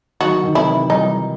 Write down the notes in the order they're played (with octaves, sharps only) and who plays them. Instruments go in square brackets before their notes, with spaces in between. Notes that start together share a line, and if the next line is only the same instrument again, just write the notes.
[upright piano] D#3 F#3 [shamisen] F#4
[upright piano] D#3
[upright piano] C3 E3 [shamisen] E4
[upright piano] E3 G3 [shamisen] D#4